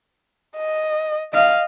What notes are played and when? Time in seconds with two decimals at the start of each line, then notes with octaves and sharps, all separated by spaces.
0.56 D#5
1.33 D#5 F5